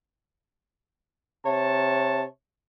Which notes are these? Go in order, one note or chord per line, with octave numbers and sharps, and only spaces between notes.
C3 C#5 A5